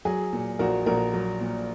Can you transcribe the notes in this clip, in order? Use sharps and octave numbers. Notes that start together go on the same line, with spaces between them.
F#3 G#4
A#2
A#1 F#4 A#4
A#1 F#4 A#4
F#3
A#2